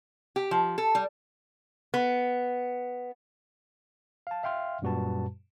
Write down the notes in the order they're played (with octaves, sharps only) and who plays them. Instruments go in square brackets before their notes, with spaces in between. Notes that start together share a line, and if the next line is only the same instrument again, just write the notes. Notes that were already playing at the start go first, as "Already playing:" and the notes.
[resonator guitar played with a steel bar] G4
F3
A4
G3
B3
[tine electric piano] F5 A5
E5 F5 G5 C6 F6
F#2 A#2 G3 F#4 B4 A5